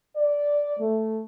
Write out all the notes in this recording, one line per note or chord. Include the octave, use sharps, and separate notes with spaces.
D5
A3